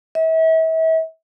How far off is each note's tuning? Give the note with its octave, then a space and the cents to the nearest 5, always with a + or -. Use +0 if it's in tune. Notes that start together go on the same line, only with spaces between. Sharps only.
E5 -35